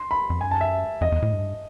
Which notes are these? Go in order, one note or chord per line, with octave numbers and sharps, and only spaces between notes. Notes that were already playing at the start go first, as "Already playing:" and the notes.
Already playing: C6
B5
F2
F#2 G#5
A5
E5
F2 D#5
E2
A2
G2